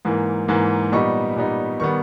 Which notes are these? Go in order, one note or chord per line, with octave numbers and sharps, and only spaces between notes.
G#2 E3 A#3
G#2 E3 A#3
A#2 G3 B3 D#4 C#6
A#2 G3 B3 D#4
D#3 G3 B3 C#6